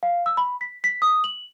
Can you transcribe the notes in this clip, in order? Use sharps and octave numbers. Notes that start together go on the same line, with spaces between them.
F5
E6
B5
B6
B6
D#6
F#7